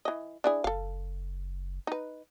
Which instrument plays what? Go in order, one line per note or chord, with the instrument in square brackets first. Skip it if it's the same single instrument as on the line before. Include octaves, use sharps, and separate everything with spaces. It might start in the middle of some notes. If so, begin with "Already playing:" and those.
[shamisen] E3 D#5
D4 E4 G#4
[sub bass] F#1 [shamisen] A4 F5
[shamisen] D#4 B4